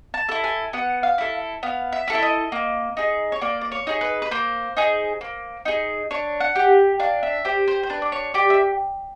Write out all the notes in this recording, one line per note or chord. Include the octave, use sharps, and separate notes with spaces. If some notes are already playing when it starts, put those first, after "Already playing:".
A5
E4 A4
G#5
B3 F#5
F5
E4 A4
B3 F5
E5
E4 A4
E5
D#5
A#3
D#4 G#4
C#5
A#3 D5
D5
C#5
D#4 G#4
B4
B4
A#3 C5
D#4 G#4
A#3
D#4 G#4
D4 C#5
F#5
G4
D4 F5
E5
G4 C5
C5
C5
D4 B4
D5
C#5
G4 D5
E5